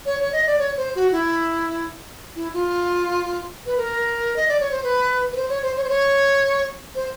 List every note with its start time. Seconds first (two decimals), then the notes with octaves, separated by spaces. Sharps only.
0.06 C#5
0.20 C#5
0.32 D#5
0.47 D5
0.59 C#5
0.77 C5
0.95 F#4
1.12 E4
2.36 E4
2.54 F4
3.66 B4
3.78 A#4
4.36 D#5
4.48 D5
4.60 C#5
4.71 C5
4.84 B4
5.33 B4
5.37 C5
5.49 C#5
5.63 C5
5.77 C#5
5.84 C5
5.90 C#5
6.95 C5